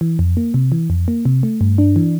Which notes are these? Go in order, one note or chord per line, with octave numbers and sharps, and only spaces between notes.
E3
F2
A#3
C3
E3
F2
A#3
C3
A3
G2
D4
E3